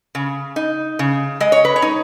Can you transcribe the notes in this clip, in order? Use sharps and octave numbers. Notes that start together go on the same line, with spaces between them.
C#3
D#4
C#3
G#3 D#5
C#5
B4
C#5
D#4